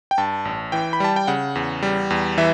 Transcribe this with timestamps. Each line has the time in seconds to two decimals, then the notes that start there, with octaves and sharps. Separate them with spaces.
0.11 G5
0.18 G2 A5
0.45 A1
0.72 E3 G5
0.93 B5
1.00 G3 A5
1.16 G5
1.28 C#3 F#5
1.55 E2
1.83 G3
2.10 E2
2.38 E3 E5